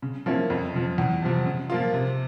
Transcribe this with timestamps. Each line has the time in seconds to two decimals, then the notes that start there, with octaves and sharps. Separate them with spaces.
0.02 C#3
0.26 F3 A#3 C#4 E4
0.50 F2
0.74 C#3 F3
0.98 E2
1.22 C3 F3
1.46 C#3
1.70 F3 A#3 F4
1.93 C3